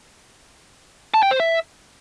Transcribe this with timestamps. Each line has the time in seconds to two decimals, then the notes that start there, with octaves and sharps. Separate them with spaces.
1.14 A5
1.23 G5
1.31 C5
1.40 E5